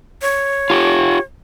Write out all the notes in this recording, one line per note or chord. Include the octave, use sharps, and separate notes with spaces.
C#5
F4 G4